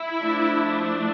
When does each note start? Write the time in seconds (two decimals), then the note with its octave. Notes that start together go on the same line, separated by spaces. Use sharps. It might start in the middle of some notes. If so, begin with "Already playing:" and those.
Already playing: E4
0.20 F3 A3 D4